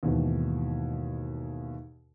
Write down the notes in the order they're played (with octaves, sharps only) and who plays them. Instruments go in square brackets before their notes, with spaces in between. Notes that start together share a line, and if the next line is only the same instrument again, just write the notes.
[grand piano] D#2 G#2 B2 E3